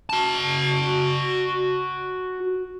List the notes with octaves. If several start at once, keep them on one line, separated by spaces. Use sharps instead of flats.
F#4 A5